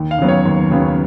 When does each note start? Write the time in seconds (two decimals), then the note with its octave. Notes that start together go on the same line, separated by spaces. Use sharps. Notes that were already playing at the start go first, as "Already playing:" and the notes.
Already playing: D#2
0.11 F5
0.19 C#3 F#3 B3
0.28 C#5
0.46 D#2
0.71 C#3 F#3 B3